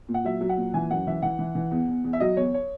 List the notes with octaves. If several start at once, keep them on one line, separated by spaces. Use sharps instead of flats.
A#2
F#5
F#3 E5
F#3
F#5
A#2
E3 G#5
F#2 F#5
E3 E5
E3 F#5
E3
E3
E2
E2
E2
E5
F#3 D#5
E2 C#5
C#5